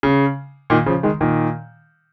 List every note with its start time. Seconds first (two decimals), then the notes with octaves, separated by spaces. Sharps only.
0.03 C#3
0.70 A#2 D#3
0.86 C#3 F3
1.03 D#3 G#3
1.21 A#2 D#3